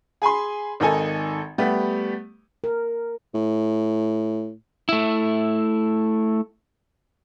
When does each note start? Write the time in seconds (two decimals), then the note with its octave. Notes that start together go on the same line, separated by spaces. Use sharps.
0.22 G#4 G#5 B5 C6
0.80 G#1 D#3 D#4 A4 G#5
1.58 G3 A3 B3 G4
2.64 A#4
3.34 A2
4.89 A3 E4